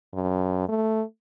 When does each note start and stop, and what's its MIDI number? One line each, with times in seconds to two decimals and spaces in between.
0.14 0.66 42
0.68 1.02 57